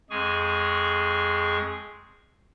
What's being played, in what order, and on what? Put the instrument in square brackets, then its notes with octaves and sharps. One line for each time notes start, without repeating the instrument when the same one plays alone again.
[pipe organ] F2 G#3 G#4 G#5 C#6